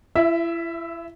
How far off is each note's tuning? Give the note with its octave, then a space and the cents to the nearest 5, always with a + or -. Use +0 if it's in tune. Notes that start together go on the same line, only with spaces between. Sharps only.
E4 +35 E5 +0